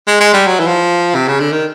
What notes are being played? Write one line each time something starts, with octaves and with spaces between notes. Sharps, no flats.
G#3
G#3
G3
F#3
E3
F3
C3
C#3
D3
D#3